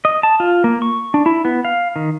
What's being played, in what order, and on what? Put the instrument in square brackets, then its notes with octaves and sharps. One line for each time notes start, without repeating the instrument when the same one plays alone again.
[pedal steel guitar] D#5
A5
F4
A#3
C#6
D4
E4
B3
F5
D#3